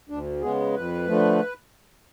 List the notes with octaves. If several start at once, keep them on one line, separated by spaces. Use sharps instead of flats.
D2 D4
C#3 G#3 B3 G#4
F2 B4
D3 F3 A3